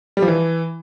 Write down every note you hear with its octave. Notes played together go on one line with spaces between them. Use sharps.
G3
F3
E3